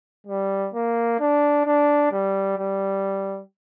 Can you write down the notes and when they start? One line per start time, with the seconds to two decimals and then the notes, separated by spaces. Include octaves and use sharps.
0.27 G3
0.74 A#3
1.20 D4
1.65 D4
2.12 G3
2.58 G3